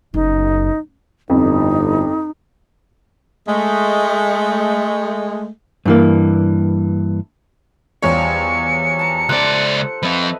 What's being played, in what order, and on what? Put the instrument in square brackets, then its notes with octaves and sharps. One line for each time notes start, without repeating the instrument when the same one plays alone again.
[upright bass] F#1 [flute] D#4
[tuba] G1 [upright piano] F2 [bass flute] D#4
[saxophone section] G#3 A3
[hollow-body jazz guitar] G2 E3 A#3
[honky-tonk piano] E2 C#5 [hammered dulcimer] F3 G3 [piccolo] C#7
[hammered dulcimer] A5 A#5
[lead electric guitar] C#2 D5 [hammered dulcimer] A4 C5 [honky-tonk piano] F#6
[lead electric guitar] F3 C4 [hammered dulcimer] B4 D#5 E5